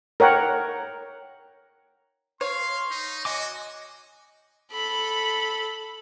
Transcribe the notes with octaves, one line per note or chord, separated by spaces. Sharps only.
A#4 C#5 F#5 G5
C#5 F5 C6
D#4
F#4 D#5 G#5 D6
A4 B5